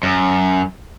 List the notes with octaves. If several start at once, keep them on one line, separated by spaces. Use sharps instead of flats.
F#2